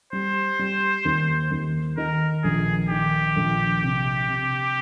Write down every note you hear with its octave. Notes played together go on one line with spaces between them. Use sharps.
G3 C5
G3
D#2
D#2
D#3 A#4
A#1 G#4
D#3 G4
A#1
C3
C3